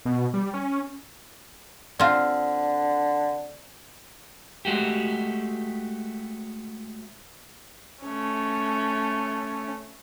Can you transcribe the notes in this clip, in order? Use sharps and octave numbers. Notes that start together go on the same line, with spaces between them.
B2
G3
C#4
D3 C4 F4
G#3 A3 F#4 G4
A3 C#4